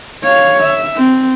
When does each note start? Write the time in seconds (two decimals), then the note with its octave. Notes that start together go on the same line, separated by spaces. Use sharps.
0.24 C#5 F5
0.64 E5
0.97 C4